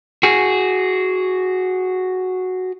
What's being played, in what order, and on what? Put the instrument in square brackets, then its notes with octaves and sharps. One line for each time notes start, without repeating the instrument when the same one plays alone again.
[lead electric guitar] F#4 G#4